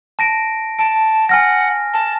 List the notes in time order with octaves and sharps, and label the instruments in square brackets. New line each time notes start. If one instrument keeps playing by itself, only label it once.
[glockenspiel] A5 A#6 D7
[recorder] A5 [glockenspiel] D7
[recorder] F#5 [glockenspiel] G#5 F6 A#6
[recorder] A5